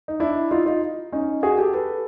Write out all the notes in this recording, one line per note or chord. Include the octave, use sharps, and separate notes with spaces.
D#4
D4 E4
D#4 F4
D#4 F4
C#4 D#4
F#4 G#4
G4 A4
A4 B4